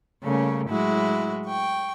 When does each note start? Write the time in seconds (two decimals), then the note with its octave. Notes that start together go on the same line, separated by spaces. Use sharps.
0.23 C#3 G3 A3 A#3 C#4
0.68 A2 F#3 G#3 E4 F#4
1.46 G5 C#6